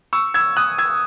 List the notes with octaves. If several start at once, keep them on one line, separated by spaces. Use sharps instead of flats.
C#6 E6
E6 G#6
D#6 F#6
E6 G#6